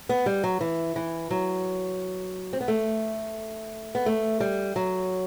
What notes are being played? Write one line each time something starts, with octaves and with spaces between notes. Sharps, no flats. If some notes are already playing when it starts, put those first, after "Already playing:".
B3
G3
F#3
E3
E3
F#3
C4
B3
A3
B3
A3
G3
F#3